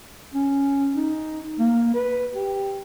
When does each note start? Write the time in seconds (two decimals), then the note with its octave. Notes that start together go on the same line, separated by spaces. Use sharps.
0.34 C#4
0.96 D#4
1.59 A#3
1.94 B4
2.34 G4